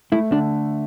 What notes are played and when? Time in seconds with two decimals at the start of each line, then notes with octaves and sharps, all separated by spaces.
0.12 A3 E4
0.32 D3 D4